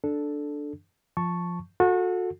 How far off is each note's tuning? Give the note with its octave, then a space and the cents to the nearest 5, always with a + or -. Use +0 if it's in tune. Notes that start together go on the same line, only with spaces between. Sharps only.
D4 +0 A4 -5
F3 +0 A5 +0 C#6 +0
F#4 -30 A4 +0